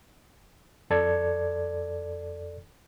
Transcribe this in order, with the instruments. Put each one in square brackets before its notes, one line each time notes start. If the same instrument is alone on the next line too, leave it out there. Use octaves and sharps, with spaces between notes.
[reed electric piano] F2 A4 D5 G#6